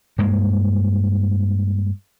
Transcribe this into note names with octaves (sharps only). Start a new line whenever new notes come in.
G2 G#3 A#3